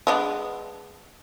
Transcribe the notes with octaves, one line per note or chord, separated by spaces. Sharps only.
G#3 B3 D4